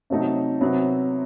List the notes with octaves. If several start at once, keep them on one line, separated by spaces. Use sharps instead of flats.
C3 F#3 A3 D#4
C3 F#3 B3